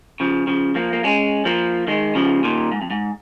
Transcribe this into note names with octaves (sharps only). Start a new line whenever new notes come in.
C#3 F3
C#3 F3
F3 A#3
A#3
G#3 C#4
F3 A#3
D#3 G#3
C#3 F3
A#2 D#3
G#2
F2
G#2